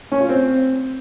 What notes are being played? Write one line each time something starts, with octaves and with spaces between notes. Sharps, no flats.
C#4
F4
C4